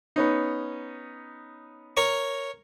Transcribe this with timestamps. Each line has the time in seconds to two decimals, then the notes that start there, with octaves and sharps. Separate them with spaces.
0.16 B3 C#4 D#4
1.97 A#4 C#5 C#6